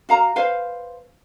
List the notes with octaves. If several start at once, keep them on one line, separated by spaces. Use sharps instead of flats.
F#4 F5 A#5
B4 C5 F5